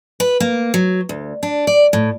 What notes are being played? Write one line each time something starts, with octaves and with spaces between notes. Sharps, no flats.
B4
A#3
F#3
D2
D4
D5
A2